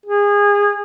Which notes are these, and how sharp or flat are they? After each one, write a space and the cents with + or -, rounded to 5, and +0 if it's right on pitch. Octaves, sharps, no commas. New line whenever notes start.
G#4 -25